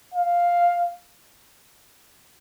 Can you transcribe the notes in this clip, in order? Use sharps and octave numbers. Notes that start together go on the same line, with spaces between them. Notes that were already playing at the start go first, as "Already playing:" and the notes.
F5